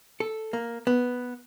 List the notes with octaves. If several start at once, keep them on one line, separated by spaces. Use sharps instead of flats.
A4
A#3
B3